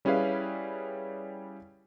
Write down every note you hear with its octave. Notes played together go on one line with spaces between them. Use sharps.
G3 C#4 E4 G#4 B4 F5